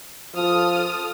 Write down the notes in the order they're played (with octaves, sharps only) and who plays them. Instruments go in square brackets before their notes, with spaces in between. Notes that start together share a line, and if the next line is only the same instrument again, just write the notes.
[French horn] F3 [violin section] A4 D#6 F6